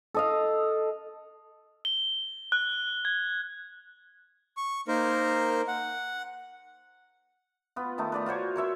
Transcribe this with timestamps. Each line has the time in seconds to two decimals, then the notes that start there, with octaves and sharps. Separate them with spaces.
0.14 A4 D#5 F5
1.85 G7
2.52 F#6
3.05 G#6
4.57 C#6
4.88 A#3 D#4 A#4 C5
5.68 F#5
7.76 B3 F4
7.98 D#3 A3 D#4
8.12 B4 D5 A#5
8.26 F4 F#4 C5 C#5
8.56 A#4 C#5 E5 C6